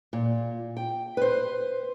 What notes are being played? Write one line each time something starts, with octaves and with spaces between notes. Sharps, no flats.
A#2
G5
B4 C5